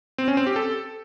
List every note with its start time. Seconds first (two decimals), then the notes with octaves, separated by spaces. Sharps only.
0.18 C4
0.28 C#4
0.37 C4
0.47 G4
0.56 A4